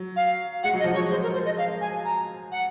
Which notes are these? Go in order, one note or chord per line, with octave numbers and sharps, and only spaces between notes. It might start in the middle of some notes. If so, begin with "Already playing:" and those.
Already playing: F#3
F5
G#3 F#5
F#3
D#5
F3
F#3 C#5
G#3 C5
A#4
C5
D#5
F5
G#5
A#5
F#5